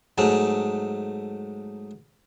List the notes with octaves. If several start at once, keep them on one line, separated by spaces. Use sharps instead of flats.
G#2 F#3 G#3 A3